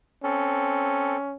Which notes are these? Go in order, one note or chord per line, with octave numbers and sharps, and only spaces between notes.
C4 C#4 A4